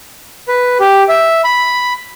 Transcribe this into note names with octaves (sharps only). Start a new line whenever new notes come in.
B4
G4
E5
B5